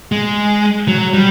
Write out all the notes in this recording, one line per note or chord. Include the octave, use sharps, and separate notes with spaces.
G#3
F#3
G3